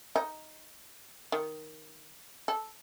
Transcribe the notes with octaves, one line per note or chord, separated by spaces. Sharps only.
D#4
D#3
A4